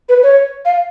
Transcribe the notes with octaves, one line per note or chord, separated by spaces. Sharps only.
B4
C#5
F5